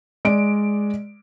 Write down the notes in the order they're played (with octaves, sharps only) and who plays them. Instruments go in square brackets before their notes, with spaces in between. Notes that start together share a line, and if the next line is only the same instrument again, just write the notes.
[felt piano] G#3 D5 D7